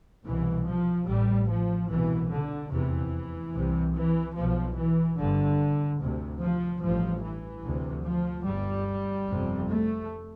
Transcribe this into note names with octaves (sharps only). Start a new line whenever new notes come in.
C2 B2 E3
F3
A1 A2 G3
F3
C2 B2 E3
D3
F1 E2 C3 E3
C2 C3
E3
B1 B2 F3
E3
G1 G2 D3
D2 C3
F3
A1 G2 F3
E3
D2 C3
F3
G1 G2 G3
G1 F2 C3
A3